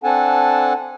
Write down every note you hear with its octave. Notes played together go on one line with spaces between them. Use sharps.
C4 D4 A4 F#5 G#5 A5